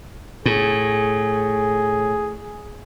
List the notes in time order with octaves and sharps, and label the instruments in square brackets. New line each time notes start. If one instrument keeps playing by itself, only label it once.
[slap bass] A2 [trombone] G#4